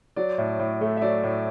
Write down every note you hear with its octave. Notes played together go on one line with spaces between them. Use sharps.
F#3 D5
A2
A2
A3
E5
F#3 D5
A2